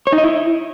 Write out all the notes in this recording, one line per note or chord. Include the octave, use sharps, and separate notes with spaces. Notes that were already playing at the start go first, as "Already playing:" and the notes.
C#5
D#4
D#5
E4